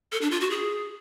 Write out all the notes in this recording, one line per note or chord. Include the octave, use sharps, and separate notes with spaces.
A4
D4
F4
F#4
G#4